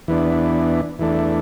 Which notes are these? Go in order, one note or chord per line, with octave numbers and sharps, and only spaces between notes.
E2 E3 B3 D4
E2 E3 A3 D4